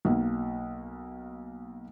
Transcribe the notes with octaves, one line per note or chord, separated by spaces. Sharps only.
B1 A#3